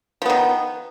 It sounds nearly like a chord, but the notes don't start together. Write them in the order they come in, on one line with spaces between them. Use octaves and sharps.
F3 B3 D#3